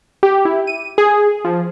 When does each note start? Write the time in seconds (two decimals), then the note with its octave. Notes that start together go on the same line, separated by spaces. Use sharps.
0.23 G4
0.45 E4
0.67 D#7
0.98 G#4
1.45 F3